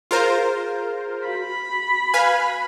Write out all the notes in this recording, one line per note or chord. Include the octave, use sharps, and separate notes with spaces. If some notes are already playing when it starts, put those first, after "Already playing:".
F4 G#4 A#4 C5
F#4 B5
B4 F5 G#5